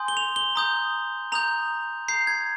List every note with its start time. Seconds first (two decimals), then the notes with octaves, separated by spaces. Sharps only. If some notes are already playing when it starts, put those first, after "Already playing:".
Already playing: G#5 C6 D#6 G6
0.08 G7
0.17 F7
0.36 G7
0.56 A#5 D#6 G6
1.32 A#5 D#6 G6 F7
2.08 A#5 D#6 G6 C7
2.27 G#6